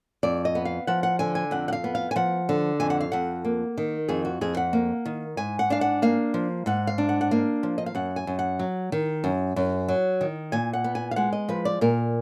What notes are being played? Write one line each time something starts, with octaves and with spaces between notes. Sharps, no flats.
F2 D5
D#5
B3
F5
F3 F#5
F#5
D3 G#5
G#5
F2 F#5
F#5
F5
B3
F5
G#5
F3 F#5
D3
F2 G#5
F#5
F5
F2 F#5
A#3
D#3
F2 G#4
F#4
F2 G#4
F#5
A#3
D#3
G#2 G#5
F#5
D4 F5
F#5
A#3 F5
F3
G#2 F#5
F5
D4
F#5
F#5
A#3 F5
F3
D#5
F5
F#2 F#5
G#5
F#2
F#5
F#3
D#3
F#2
F#2
F#3
D#3
A#2 G#5
F#5
B3
G#5
F5
G#3 F#5
D#5
F3 B4
D5
A#2 A#4